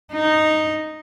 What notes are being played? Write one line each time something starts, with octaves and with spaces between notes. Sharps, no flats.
D#4